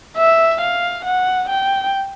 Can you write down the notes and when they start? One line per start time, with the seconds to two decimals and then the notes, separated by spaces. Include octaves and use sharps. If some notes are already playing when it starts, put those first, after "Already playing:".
0.17 E5
0.61 F5
1.05 F#5
1.49 G5